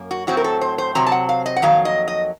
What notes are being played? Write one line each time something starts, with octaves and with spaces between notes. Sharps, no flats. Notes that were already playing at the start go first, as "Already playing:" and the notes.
Already playing: F#2 A#3
F#4
A2 F#3 C4 F#4
A#4
A4
C5
C5
C3 F#3 C4 A#5
A5
F#5
F5
D#5
F#5
F2 D#3 F#3 A#3 F5
D#5
D#5